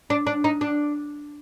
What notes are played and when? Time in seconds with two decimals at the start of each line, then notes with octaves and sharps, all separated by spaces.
0.10 D4
0.27 D4
0.44 D#4
0.61 D4